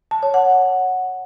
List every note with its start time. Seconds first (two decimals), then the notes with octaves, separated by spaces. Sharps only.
0.11 A5
0.23 C#5
0.34 F#5